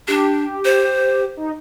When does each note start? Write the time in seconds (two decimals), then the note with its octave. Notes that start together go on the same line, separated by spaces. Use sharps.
0.08 D4 G4
0.65 C5
1.37 D#4